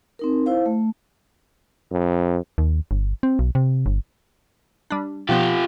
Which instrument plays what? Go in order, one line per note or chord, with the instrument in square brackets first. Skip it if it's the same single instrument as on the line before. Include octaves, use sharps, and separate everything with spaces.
[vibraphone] C4 D#4 A#4
E4 C5 F5
A3
[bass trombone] F2
[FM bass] D#2
G1
C4
B1
C3
G1
[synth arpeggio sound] G3 D4
[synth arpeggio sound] B2 F3 B3 [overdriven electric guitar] F4 G4